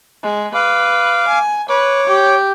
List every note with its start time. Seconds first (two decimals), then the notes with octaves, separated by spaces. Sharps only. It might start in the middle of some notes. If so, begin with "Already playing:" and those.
0.24 G#3
0.54 B4 F5 D6
1.28 G#5
1.69 B4 C#5 D6
2.07 G4